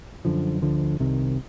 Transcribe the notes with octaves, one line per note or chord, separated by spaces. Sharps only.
F#2 D3 F3
D2 D3 F3
C2 C3 D#3